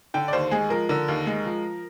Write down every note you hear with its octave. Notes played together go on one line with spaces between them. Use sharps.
D3 G5
D5
D#2 C5
G#3 G#4
F3 A#4
D3 A#4
D#2
G#3
F3